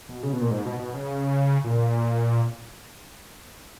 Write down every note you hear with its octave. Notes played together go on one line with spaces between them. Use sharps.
B2
C#3
B2
A#2
G#2
B2
B2
C#3
A#2